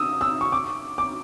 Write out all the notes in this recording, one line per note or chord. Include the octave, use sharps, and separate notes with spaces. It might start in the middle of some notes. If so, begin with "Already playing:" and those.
Already playing: D#6 E6
E6
C#6
D6
D6